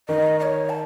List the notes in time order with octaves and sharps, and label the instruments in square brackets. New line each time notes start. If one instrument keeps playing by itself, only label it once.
[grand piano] D#3 [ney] D#5
[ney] D#5
C#5
A5